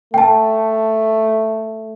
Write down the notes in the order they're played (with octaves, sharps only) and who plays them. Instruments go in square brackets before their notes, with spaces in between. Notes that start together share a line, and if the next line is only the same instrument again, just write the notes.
[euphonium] A3 [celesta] G5 A5